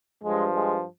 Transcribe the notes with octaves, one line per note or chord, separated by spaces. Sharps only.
G2 F3 G#3
G#3